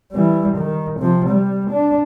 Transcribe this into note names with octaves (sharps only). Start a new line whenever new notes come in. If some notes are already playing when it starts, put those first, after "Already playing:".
E3 G3
D#3
C3 F3
G3
D4